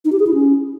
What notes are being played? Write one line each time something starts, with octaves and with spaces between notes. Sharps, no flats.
D#4
G4
G#4
E4
C#4